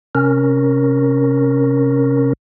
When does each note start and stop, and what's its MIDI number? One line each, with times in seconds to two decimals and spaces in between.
0.15 2.33 48
0.15 2.33 61
0.15 2.33 70